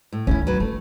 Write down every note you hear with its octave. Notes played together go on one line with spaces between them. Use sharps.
A2
D2 D#3 C#4 E4
F#3 B4
E3 A3